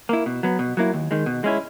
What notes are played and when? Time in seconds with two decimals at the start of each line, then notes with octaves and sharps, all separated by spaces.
0.09 A#3 E4
0.26 B2
0.43 F#3 B3
0.59 B2
0.77 F#3 A#3 E4
0.94 D#2
1.11 D#3 G#3
1.26 B2
1.44 G#3 C#4 E4